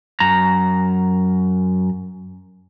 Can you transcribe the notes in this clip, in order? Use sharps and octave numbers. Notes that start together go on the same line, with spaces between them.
F#2 A#5